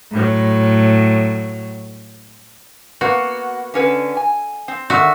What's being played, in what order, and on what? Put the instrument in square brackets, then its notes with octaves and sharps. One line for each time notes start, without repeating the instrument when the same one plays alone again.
[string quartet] A2 F#3
[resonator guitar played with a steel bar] A#3 B3 [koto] F#4
[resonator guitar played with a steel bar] D3 C#4 B4
G#5
C4
[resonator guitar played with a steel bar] D3 D#3 [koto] F#4 E5